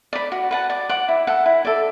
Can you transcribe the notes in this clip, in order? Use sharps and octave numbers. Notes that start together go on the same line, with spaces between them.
D5 B5
F#4
B4 F#5 A5
D5
F#5 D6
E4
A4 F#5
E4
A4 D5